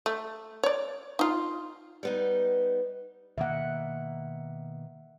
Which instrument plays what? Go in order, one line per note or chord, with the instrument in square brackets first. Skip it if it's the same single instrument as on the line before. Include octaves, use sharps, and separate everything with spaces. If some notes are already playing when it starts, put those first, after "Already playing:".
[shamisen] A3
C#5 D5
D#4 F4
[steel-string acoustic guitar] G3 B3 D#4
[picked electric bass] B2 D#3 A#3 [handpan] E5 F#5